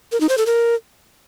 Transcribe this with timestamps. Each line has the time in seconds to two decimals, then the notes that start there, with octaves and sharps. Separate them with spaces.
0.12 A#4
0.21 D#4
0.29 C5
0.38 A4
0.46 A#4